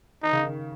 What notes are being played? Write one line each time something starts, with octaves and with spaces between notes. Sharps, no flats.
D#3 D#4
C#3
D#3